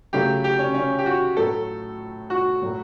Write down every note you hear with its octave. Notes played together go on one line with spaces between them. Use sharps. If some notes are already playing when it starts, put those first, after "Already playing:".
C#3 F#3 A3 G4
G4
C#4
C#4
G4
F#4
A2 F#3 A3 A4
F#4
A2 F#3 A3